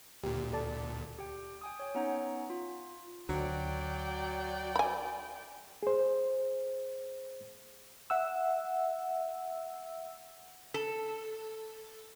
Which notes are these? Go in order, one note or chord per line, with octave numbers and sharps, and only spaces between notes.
D2 A#2 G4
A4 D5 A5
G4 G5
G5 G#5 D#6
C#5 G5
B3 C#4 D#4 C#5 F#5 A#5
F4
D2 F#3 D5 G5
G#5 B5
G#4 C5
E5 F#5 E6
A4